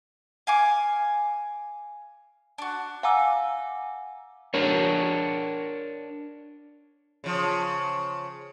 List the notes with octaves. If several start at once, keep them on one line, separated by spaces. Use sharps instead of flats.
F5 G#5 D6
D4 F#4
F5 F#5 G#5 A#5 D6 E6
D4 A#4 C#5
C#3 F3